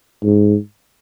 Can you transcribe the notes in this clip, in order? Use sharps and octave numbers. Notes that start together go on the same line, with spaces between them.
G#2